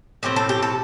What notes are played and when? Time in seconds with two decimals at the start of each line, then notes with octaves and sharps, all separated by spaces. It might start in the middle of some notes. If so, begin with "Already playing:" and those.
0.23 A2 F3 A3 C4 G4
0.36 A4
0.49 G4
0.62 A4